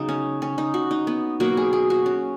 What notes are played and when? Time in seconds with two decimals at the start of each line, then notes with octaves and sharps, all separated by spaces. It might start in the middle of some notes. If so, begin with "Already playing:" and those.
Already playing: C#3 F#3 B3 D#4
0.09 C#4
0.42 C#4
0.58 D#4
0.74 F#4
0.91 D#4
1.07 B3
1.40 B2 F#3 A#3 F#4
1.57 G#4
1.73 G#4
1.90 F#4
2.06 C#4